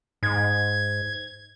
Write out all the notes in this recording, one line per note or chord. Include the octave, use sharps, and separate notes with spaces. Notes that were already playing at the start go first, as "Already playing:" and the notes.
G#2 G#6